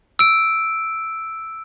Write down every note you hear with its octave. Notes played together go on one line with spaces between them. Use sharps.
E6 D7